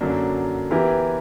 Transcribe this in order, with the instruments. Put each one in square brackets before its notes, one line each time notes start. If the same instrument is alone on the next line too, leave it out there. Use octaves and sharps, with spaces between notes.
[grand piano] F#2 D3 F#3 A#3 D4
E3 B3 E4 G4 A#4